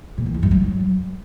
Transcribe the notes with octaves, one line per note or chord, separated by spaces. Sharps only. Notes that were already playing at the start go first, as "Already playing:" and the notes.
A#2
E3
E2
G2
F#3